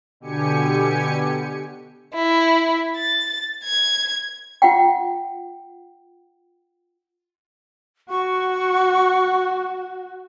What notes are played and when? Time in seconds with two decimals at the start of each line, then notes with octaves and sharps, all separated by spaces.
0.20 B2 D3 G4 G#5 C#7
2.15 E4
2.96 A6
3.64 G#6
4.62 F4 F#5 G5
8.10 F#4 C#6